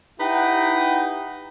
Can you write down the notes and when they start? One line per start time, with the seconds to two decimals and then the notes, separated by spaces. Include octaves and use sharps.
0.20 D#4 E4 G4 B4 F#5 G5